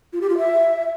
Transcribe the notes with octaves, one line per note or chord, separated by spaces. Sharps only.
F4
G4
F4
E5